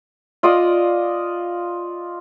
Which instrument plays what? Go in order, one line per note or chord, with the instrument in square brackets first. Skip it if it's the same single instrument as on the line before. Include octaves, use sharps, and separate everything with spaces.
[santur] F4 D5 D#5 D#6